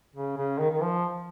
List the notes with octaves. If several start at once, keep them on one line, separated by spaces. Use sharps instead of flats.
C#3
C#3
D#3
D#3
F3